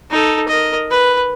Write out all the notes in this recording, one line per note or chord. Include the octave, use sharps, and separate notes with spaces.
D#4 A4
A#4 D#5
B4